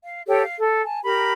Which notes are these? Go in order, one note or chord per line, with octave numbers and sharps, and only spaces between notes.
F5
G4 A4 C#5 G5
F5
A4
G#5 A5
G4 A#4 A#5 B5